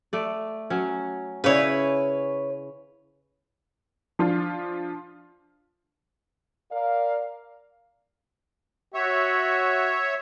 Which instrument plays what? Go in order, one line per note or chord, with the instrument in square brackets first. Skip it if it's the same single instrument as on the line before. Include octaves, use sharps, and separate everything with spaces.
[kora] A3 D5
F#3 C#4
[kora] C#3 E4 G#4 [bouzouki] B4 C#5
[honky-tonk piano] F3 D4 F4
[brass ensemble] A#4 D5 F5
[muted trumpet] F#4 [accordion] C#5 E5